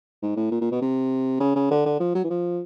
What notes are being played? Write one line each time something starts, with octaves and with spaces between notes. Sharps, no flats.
G#2
A2
A#2
A#2
B2
C3
C#3
C#3
D3
D3
F3
F#3
E3
F3